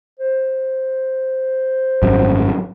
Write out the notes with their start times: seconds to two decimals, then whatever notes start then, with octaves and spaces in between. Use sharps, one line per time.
0.19 C5
2.03 G#1 F#2